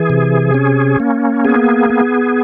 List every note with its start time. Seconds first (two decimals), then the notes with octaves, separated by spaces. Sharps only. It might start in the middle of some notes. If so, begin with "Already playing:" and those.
Already playing: E3 G#4
0.10 C3
0.54 C#4
1.00 A#3
1.45 B3 G#4
1.90 B3